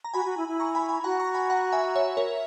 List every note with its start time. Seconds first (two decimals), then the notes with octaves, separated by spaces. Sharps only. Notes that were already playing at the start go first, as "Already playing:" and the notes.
0.04 A#5
0.14 F#4 G#5 B5
0.25 F#4
0.37 E4
0.48 E4
0.60 A#5 C#6
0.75 G#5 B5
0.89 G#5 B5
1.04 F#4 F#5 A#5
1.19 A#5 C#6
1.34 G#5 B5
1.50 F#5 A#5
1.72 E5 G#5
1.95 C#5 E5
2.17 A#4 C#5